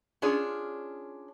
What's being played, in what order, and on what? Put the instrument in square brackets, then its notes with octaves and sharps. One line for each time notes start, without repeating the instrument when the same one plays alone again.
[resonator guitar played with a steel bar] C#4 D4 F4 G#4 C#5